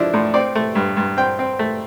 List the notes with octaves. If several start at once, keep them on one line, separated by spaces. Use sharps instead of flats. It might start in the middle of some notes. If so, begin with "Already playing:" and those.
Already playing: F3 D4 E4
A2
C4 D5
A3
G2
G2
C4 G5
C4
A3